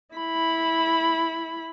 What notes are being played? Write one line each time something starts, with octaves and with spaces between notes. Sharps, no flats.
E4 B5